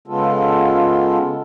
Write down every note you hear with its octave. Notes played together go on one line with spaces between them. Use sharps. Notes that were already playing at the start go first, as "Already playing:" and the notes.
C#3 G#3 B3 F4 A4